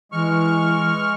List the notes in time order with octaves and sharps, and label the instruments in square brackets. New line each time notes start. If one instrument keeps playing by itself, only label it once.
[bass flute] E3 [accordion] G#3 C#6 F6